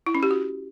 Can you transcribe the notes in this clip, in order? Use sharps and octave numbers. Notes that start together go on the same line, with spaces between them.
E4
C#4
G4
F#4